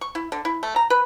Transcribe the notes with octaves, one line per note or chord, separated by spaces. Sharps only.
C#6
E4
D3
E4
A3
A#5
B4